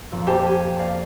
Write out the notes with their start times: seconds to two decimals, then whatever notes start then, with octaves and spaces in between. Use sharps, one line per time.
0.12 F2 A#2 F3
0.27 A#3 G4 C5 A5
0.47 G#5
0.79 D5 F5